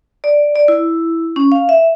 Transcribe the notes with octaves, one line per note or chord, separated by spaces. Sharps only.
D5
D5
E4
C#4
F5
E5